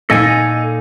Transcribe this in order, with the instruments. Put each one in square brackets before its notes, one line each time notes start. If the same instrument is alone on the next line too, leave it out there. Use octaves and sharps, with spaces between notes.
[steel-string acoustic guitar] A#2 D#4 [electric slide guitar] A4 D#5 G#5